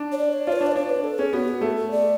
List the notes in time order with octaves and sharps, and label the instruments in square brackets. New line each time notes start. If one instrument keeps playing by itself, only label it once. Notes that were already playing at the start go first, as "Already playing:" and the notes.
Already playing: [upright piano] D4
[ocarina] C#5
D5
C#5
[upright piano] F4 [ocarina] D5
[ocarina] B4
[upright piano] D4 [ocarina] C#5
[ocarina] D5
B4
[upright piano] D4 [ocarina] C#5
[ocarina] B4
A4
[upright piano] C#4 [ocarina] G#4
[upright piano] B3 [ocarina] F#4
[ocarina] G#4
[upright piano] A3 [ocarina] A4
[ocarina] A4
D5